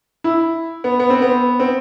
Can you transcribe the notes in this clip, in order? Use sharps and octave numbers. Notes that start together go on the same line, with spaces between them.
E4
B3
B3
C4
B3
C4